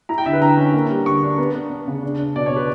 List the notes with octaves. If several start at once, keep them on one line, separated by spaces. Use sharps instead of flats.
E4 A#5
G5
D3 E5
B4
D3 A#5
C#4
A#3
G3
D3 C#6
D4
B3
B3
D4
C#3
D4
D4
B2 D5
B2 C#5
B4